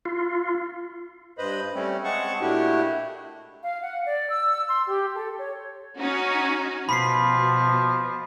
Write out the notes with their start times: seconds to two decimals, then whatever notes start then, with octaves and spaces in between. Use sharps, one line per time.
0.05 F4
1.38 G2 B4 C5 D#5 B5
1.75 G3 A3 C4 C#4
2.04 G#3 C4 G#4 F#5 A5 C#6
2.41 A#2 A3 D4 E4 F#4 G4
3.63 F5
3.82 F#5
4.06 D5
4.29 E6
4.68 C6
4.89 G4
5.15 A4
5.38 C#5
5.99 C#4 D#4 F#4
6.89 B2 F3 B5 B6 C7